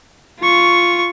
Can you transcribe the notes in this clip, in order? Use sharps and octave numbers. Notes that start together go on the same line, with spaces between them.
F4 C#6